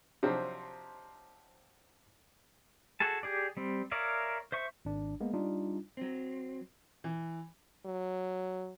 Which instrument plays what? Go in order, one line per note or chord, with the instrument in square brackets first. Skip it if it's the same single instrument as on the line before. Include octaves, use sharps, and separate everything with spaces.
[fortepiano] C3 F3 F#3 C4 D4 D#4
[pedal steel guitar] F#4 G#4 A4 A5
G4 G#4 D5
G3 C4
A#4 C#5 D5 E5 F5
C5 E5 C#6
[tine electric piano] G#1 D4
G#3 A#3 B3
G3 D4 D#4 F4
[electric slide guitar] F#3 C4
[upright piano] E3
[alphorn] F#3